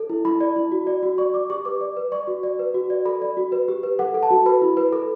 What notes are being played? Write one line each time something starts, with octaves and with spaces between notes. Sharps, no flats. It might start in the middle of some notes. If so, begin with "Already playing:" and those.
Already playing: A4
E4
E4 B5
D5
E4
F#4
D5
F#4
D5 C#6
D5 D6
G4 C#6
B4 D6
D5
B4
D5 C#6
F#4
D5
B4
F#4
D5
A4 B5
D5
F#4
B4
G4
B4
A4 F#5
A4
A5
F#4
B4 B5
E4
B4
A4